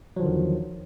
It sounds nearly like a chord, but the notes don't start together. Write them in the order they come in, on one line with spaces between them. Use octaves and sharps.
F#3 F3 D3 D#3 E2